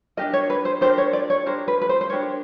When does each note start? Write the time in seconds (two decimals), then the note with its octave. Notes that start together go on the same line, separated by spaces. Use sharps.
0.17 D4 G4 A#4 D#5
0.33 C#5
0.50 B4
0.65 C5
0.81 D4 G4 A#4 C5
0.98 C#5
1.13 D5
1.30 C#5
1.46 D4 G4 A#4 C5
1.68 B4
1.81 B4
1.89 C5
2.01 C5
2.10 D4 G4 A#4 C#5